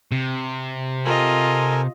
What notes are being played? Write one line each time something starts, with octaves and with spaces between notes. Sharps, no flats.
C3
F4 A4 A#4 D#5 G#5